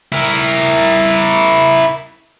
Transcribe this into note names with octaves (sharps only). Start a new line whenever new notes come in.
E4 A#4